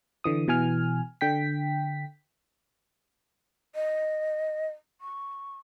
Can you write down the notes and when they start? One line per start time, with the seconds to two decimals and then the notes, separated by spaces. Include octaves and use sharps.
0.24 D3 E3 D#6
0.48 B2 E3 G#5 F6
1.21 D3 G5 B6
3.75 D#5
5.01 C#6